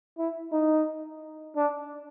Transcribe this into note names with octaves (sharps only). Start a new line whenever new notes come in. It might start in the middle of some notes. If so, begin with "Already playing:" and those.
E4
D#4
D4